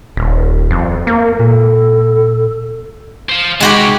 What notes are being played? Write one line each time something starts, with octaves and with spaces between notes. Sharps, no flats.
D#1
F2
A#3
A#2 A4
C5 F5
C3 G#3 F#4 G4 B5